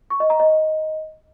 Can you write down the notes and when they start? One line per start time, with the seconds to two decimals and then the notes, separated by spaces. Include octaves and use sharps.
0.10 C#6
0.20 D#5
0.30 A#5
0.40 D#5